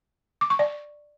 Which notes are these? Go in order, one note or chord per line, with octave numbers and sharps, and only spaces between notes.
D6
C#6
D5